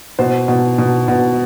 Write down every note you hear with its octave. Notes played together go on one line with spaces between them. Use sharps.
B2 C5
B2
B2
B2